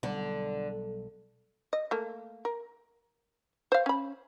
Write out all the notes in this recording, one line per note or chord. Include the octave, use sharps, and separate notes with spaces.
B1 D3 G3
D#5
A3 A#3
A#4
C5 F5
C#4 B5